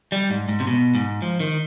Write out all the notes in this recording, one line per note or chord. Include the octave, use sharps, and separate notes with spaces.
G3
G#2
G#2
C3
B2
G#2
F3
D#3